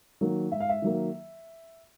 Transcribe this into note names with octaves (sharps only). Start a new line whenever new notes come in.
D#3 F#3 A#3
G#2 E5
F5
E5
D#3 F#3 A#3